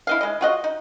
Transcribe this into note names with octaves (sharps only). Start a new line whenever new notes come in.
E4 D#5 F5
G#3 D#5
F4 F#4 D#5
D#4